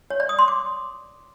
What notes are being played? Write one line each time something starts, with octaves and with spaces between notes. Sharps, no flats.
C#5
D5
D#6
C6
D6